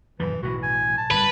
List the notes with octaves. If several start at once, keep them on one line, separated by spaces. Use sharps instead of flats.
D#1 F#2 E3 F3
B1 A2 E3 F#4
G#5
A5
G1 G3 B4